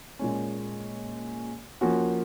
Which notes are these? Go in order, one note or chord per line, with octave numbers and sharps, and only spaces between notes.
A#2 G#3 C#4
F3 A#3 C#4 F#4